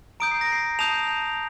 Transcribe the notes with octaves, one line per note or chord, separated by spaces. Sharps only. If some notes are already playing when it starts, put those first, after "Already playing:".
A#5 D#6 G6 D7
C7
A#6
C7
A5 D#6 G6 F7